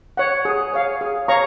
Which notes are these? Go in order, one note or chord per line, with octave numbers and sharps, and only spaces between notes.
C#5 F#5
G#4
C#5 F5
G#4
C#5 F5 A#5 C#6